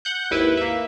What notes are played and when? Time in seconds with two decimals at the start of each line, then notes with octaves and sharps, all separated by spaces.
0.05 F#5 F#6 G6
0.31 G#1 D#2 E4 B4
0.57 A#3 E5